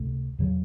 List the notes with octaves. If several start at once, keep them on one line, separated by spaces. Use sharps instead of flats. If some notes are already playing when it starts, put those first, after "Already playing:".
Already playing: C#2 C3 A3
E2 C#3 F#3